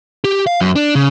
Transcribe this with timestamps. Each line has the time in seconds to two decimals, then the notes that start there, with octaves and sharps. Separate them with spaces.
0.24 G4
0.47 F5
0.61 F#2
0.76 D4
0.95 C#3